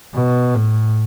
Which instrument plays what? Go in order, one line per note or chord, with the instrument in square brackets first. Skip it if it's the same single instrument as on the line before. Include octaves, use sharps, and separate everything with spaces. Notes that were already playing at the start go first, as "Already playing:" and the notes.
[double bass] B2
A2